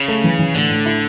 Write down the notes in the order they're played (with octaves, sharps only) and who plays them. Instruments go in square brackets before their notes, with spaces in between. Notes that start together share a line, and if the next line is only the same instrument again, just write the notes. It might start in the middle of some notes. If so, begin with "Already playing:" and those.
Already playing: [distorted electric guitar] C#3
[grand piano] A3
E3
E3
[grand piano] A2 [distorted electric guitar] D3
[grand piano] A2
E4